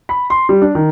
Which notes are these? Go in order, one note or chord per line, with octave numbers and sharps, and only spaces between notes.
B5
C6
G3
D4
D#3